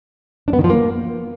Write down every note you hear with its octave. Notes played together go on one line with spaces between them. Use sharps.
D4
B3
D#3
F3
A#3